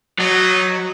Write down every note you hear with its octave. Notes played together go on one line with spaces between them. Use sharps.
F#3 B3 D#4 D#5